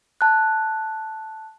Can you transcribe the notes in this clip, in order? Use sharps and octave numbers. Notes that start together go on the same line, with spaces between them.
A5 F#6